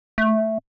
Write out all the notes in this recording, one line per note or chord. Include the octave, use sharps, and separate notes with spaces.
A3